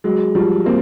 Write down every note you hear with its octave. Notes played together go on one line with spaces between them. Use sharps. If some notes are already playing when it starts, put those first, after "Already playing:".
F#3 G#3
F3 G3
A#3 C4